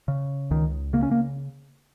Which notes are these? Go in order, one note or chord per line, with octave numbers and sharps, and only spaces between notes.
C#3
C#2 D#3
C#3 A#3
C#4
A#3